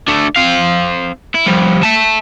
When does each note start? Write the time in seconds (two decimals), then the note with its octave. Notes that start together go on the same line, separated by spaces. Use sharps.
0.08 A3 D4
0.36 C4 F5
1.34 E4
1.46 F3 G3
1.83 E5 A5